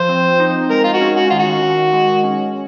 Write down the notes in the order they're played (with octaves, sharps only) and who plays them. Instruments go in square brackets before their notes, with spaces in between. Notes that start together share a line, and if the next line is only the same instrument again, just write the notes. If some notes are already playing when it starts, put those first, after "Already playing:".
Already playing: [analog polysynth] F3 [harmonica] C5
[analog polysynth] C4
D#4
[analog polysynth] G#3 [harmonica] A#4
[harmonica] F4
F#4
[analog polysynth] C#4
[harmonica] F#4
[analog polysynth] D#3 [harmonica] F4
[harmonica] F#4
[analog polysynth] D#3
G#3
C#4